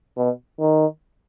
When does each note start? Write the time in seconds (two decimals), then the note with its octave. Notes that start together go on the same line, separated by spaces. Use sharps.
0.17 B2
0.60 D#3